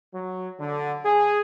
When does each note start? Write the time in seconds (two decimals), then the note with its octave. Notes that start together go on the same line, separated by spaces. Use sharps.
0.14 F#3
0.60 D3
1.06 G#4